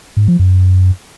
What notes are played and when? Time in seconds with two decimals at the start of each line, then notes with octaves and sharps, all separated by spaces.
0.17 G#2
0.28 F3
0.39 F#2